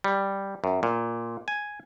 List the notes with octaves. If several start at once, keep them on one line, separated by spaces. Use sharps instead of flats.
G3
F#2
A#2
G#5